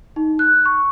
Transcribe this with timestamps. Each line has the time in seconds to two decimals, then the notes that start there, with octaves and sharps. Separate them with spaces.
0.16 D#4
0.39 F#6
0.65 C#6